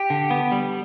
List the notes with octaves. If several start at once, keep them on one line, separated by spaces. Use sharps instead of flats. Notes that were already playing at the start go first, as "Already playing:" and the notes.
Already playing: G4
D3
B3
G3